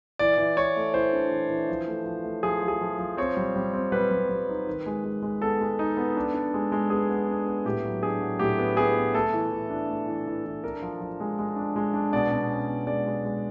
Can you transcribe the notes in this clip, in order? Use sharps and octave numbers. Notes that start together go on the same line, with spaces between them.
E3 D5
E3
E3 C#5
A3
E3 C5
D4
E3
E3
F3
A3
F3
A3
F3 G#4
F3
G#4
F3
F3
C4 C#5
G3
G3
C4
G3 B4
G3
G3
D#4
D#3
G#3
G#3
G#3
B3 A4
G#3
D#4
B3
D4
D4
G#3
G#3
B3 G#4
B3
D4
B3
A2 G4
F#3
D4 G#4
F#3
A2 G4
B3
B3 G#4
B3
A3 A4
E3
E3
D4
A3
E3
E3
E3
D4 A#4
F3
F3
G#3
G#3
D4
G#3
D4
B2 D5
B2
C#4
B2
G#3 D5
G#3
G#3